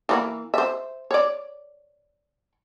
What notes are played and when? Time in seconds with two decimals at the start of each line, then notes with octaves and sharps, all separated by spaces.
0.09 E3 A#3 B5
0.54 C5 E5
1.11 C#5 D5